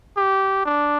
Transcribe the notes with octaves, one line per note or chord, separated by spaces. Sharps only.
G4
D4